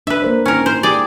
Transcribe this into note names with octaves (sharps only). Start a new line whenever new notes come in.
D4 B4 E5
A#3 A#4 C5
C#4 D#4 E4 A#4
C5
G4 G#4 D5